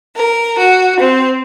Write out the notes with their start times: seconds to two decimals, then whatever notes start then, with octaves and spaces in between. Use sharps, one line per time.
0.16 A#4
0.58 F#4
0.99 C4